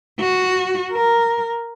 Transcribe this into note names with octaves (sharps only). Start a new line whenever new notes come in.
F#4
A#4